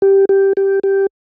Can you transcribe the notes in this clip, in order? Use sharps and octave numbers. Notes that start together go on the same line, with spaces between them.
G4
G4
G4
G4